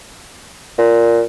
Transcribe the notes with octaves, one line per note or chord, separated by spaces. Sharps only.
A#2